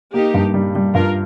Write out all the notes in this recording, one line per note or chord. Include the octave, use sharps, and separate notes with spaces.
A#3 D#4 G4
G2
G3
G3
G2 F4 A#4